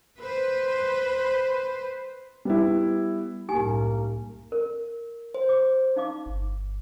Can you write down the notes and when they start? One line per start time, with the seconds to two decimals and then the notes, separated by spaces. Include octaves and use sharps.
0.19 B4 C5
2.45 G3 B3 E4
3.49 C2 F#2 A2 A#3 D#4 G4 G#5
4.52 A#4
5.34 C5
5.49 D6
5.96 D#4 F5 D6
6.26 G1